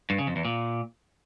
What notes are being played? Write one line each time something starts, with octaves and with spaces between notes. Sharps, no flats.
G2
C#3
F2
E2
A#2